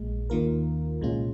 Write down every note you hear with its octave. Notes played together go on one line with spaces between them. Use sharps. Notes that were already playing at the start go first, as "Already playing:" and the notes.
Already playing: A#1 A#2 G#3
D#2 D#3 A#3 F4 A#4
C2 A#2 G#3 C#4 F4